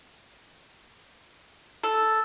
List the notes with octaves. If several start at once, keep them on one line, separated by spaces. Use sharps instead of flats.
A4